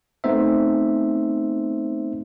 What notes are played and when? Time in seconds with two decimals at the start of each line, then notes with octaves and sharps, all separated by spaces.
0.24 A3 B3 C4 D#4 C5 E5